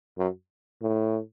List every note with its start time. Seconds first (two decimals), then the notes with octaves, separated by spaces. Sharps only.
0.18 F#2
0.82 A2